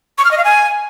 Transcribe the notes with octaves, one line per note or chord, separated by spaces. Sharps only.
C#6
F6
D#5
F5
G#5